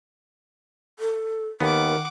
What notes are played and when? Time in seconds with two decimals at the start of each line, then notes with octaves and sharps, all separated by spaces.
0.99 A4
1.60 D#2 D#3 B3 A#4 F#5 D6